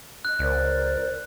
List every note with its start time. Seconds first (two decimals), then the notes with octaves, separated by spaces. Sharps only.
0.25 D#5 F#6
0.39 C#2 A#4 C5 D5